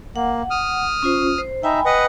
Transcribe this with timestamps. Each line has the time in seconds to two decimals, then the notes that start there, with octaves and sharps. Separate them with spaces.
0.16 A#3 F#5
0.50 D#6 F6
1.03 C#4 F4 C5
1.38 C5
1.63 D#4 E5 G5 G#5 B5
1.86 B4 D#5 F#5